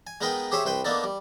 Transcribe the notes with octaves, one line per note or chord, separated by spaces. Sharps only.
G#5
G#3 B3 D#4 A#4 B4 G5
G4 G#4 C5 C#5 E5
C2 B4 C5 G5
A#3 B3 D4 D#4 A4
G3